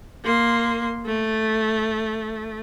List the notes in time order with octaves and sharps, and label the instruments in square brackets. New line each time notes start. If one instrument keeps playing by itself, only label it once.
[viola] A#3 C6
A3